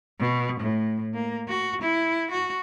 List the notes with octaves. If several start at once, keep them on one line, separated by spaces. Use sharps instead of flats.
B2
A2
A#3
F#4
E4
F#4